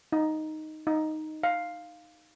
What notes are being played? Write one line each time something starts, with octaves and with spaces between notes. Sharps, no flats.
D#4
D#4
F5